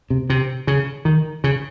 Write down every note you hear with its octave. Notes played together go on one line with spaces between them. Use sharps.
C3
C3
C#3
D#3
C#3